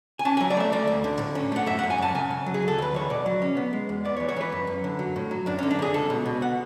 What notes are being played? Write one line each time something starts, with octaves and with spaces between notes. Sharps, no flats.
G#5
C#4 A5
G#5
F#3
D5
A3 E5
A3 D5
D2
D3
A2
C#4
A3 F#5
F#2 E5
F#5
F#2
G#5
F#2 A5
C#3 G#5
C#3
F#3
G#4
D2
A4
D2 B4
E3 C#5
B2 D5
F#3
C#4
B3
G#3
E2
B3 D5
C#5
E3
C#5
E3 B4
F#2
F#2
D3
F#3
A2
F#3
F#2 D4
C#4
D3
D4
D3 G#4
C#2 A4
B2
B2
F#5